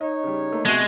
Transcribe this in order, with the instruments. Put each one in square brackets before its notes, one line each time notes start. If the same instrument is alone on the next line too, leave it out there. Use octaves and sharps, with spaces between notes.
[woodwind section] D#4 C#5 [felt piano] D#5
[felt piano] C#3 G3
A3 A#3
[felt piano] C2 B2 [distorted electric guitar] G#3 [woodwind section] A3 F#4